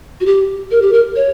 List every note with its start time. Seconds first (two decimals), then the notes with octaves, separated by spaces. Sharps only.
0.20 F#4
0.26 G4
0.71 A#4
0.82 G4
0.93 A#4
1.16 C#5